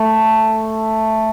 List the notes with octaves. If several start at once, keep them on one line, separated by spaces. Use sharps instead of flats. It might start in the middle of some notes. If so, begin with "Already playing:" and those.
Already playing: A3